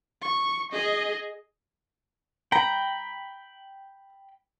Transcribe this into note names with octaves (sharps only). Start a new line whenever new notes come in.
C#6
G#4 D#5
G5 A#5 B5